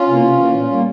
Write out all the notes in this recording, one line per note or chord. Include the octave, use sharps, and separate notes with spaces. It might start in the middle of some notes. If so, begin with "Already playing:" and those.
Already playing: C#4 F4
C3 E3 A#3
C3
E3 A#3
A#2
G3 A#3